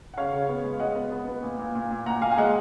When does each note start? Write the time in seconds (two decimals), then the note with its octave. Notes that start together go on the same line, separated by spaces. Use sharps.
0.14 F#5
0.17 C#3 C#5 F5
0.33 C#3
0.49 B3
0.64 G#3
0.80 G#3 D#5 F#5
0.96 B3
1.12 B3
1.28 B3
1.43 A#2
1.59 A#2
1.75 A#2
1.91 A#2
2.06 A#2 F#5 A#5
2.21 A#2 F5 G#5
2.31 G#5
2.38 G#3 D#5 F#5